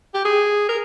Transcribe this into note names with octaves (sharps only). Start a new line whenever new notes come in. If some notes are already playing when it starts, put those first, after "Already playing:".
G4
G#4
A#4